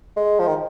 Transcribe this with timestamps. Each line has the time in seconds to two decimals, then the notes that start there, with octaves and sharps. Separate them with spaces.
0.16 G#3
0.39 F3
0.47 D#3